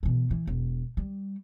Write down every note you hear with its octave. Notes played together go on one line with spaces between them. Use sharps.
B2 E3
E3
E1
G3